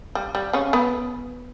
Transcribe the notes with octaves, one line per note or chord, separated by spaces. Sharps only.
G3
G3
C#3 C#4
B3 B4